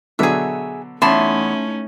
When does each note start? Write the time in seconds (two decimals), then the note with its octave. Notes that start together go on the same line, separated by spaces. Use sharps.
0.19 B2 D3 F#3 G#4 E5
1.02 E2 A3 C#4 D#4 A5 B5 C6